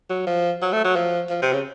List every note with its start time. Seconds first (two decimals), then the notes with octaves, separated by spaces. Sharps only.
0.10 F#3
0.27 F3
0.62 F#3
0.72 A3
0.84 F#3
0.96 F3
1.30 F3
1.42 C3
1.53 C#3